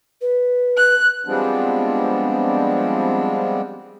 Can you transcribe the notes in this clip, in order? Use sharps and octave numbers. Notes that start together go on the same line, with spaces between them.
B4
F#6
F3 G3 G#3 B3 C4 D4